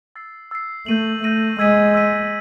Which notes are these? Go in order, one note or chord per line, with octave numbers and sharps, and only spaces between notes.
E6 A6 C7
E6 A6 C7
A3 G6 A#6 D#7 F#7
A3 G6 A#6 D#7 F#7
G#3 E6 G#6 B6 D#7
E6 G#6 B6 D#7